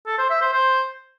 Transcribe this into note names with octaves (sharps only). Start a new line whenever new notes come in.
A4
C5
E5
C5
C5